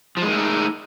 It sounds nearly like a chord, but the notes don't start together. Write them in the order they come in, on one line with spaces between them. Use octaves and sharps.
F3 G#3 D#3 A3 D#4